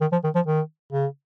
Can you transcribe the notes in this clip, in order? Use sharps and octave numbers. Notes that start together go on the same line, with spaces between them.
D#3
F3
D#3
F3
D#3
C#3